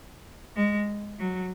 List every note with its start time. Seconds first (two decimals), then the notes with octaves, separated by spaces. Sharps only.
0.56 G#3
1.19 F#3